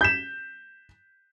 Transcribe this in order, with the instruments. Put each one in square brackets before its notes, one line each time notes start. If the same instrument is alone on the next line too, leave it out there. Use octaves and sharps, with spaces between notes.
[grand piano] G6 B6 E7